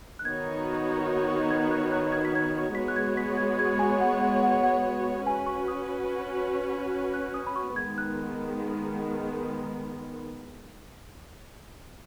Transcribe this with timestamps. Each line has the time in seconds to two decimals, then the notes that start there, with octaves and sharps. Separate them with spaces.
0.19 F#6
0.25 D#3 B3 D#4 F#4 C#5 G#6
1.50 G#6
1.71 F#6
1.92 F#6
2.12 G#6
2.25 B6
2.35 G#6
2.75 G#3 B3 F#4 C#5 B6
2.88 F#6
2.96 G#6
3.17 B6
3.37 G#6
3.59 G#6
3.79 G#5
4.00 F#5
4.21 F#5
4.43 F#5
4.63 F#5
5.26 C#4 F#4 B4 G#5
5.46 C#6
5.68 D#6
7.14 F#6
7.34 D#6
7.47 B5
7.56 C#6
7.76 D#3 G#3 B3 G#6
7.98 F#6